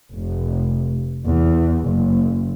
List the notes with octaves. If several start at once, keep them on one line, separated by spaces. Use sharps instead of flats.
F1
E2
F#1